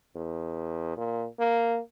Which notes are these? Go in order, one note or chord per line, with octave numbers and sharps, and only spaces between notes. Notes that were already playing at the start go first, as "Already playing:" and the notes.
E2
A#2
A#3